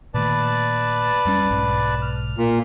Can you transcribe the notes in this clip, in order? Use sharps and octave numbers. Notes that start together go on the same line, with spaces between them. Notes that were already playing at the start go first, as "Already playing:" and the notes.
A#2 D#3 A3 B4 D5 A5
F2 G3 C#4
B1 G#2
F6
A#2